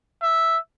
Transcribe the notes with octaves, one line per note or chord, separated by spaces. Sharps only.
E5